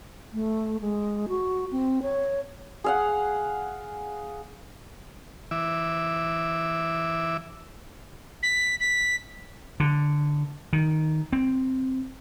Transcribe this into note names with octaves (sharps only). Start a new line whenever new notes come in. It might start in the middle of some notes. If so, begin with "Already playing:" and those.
A3
G#3
F#4
C4
C#5
G#4 F5 F#5
E3 E5 D6
B6
B6
D3
D#3
C4